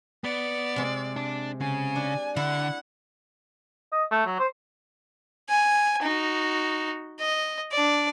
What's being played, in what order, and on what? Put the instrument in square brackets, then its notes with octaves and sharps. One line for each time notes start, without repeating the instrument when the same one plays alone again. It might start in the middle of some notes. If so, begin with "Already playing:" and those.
[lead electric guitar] B3 [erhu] D5
[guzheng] C3 G#3
[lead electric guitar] D4
[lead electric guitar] C#3 [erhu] G#5
[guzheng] D4
[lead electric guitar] D3 [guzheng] E4 [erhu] F#5
[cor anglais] D#5
A3
F#3
C5
[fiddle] G#5
D#4 F#4
D#5
D4 D5